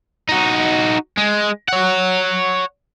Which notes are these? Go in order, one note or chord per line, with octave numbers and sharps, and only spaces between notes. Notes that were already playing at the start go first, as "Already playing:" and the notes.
D#4 F#4
G#3
C#5 F#5